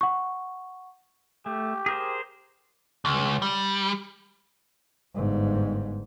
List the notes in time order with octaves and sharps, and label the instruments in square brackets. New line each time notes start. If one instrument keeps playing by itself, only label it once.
[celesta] F#5 C#6
[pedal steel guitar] A3 [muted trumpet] G4
[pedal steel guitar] G#4 A#4 C5
[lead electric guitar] C#2
G3
[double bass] G1 G#2